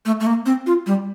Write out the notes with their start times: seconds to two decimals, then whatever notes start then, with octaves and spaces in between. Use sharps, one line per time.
0.06 A3
0.20 A3
0.26 A#3
0.46 C4
0.67 F4
0.87 G3